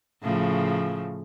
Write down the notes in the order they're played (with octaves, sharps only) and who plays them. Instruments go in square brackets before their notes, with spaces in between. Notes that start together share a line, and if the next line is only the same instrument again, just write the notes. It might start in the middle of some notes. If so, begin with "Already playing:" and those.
[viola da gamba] A2 C#3 F3